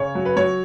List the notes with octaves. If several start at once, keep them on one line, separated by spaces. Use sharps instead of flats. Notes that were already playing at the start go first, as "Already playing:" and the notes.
Already playing: C#3 C#5
F#3
B4
F#3 C#5